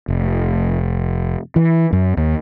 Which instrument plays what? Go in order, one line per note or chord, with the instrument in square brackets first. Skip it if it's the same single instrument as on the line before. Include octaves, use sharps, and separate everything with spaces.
[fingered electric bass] F1
E3
F#2
D#2